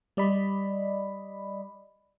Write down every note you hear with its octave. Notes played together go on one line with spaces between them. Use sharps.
G3 D5 D#5 B5